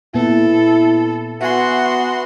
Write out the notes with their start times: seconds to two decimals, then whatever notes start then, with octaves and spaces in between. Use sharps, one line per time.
0.15 A#2 B3 E4 A4
1.41 B3 F#4 E5 G#5 C6